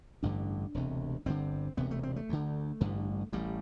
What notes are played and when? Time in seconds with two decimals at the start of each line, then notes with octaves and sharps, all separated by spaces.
0.23 A1 G2 D3 D4
0.74 E1 D2 C3
1.26 G1 G2 D3 C4
1.77 E1 D2 C3 B3
1.91 A3
2.03 C4
2.16 A3
2.29 D2 D3
2.81 A1 G2 D3
3.32 A1 A2 G3